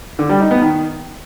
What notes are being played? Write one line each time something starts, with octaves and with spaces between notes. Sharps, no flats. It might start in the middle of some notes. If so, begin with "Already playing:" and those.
D3
G3
D#4
B3
D#3